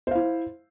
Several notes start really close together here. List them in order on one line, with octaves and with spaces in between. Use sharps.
C5 F5 E4